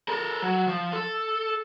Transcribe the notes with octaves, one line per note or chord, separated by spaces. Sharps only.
A4 A#4
F#3
F3
A4